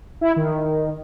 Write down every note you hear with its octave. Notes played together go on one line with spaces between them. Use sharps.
E4
D#3